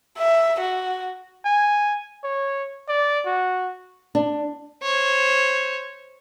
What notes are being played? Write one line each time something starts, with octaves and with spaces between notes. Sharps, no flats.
E5
F#4
G#5
C#5
D5
F#4
D4
C5 C#5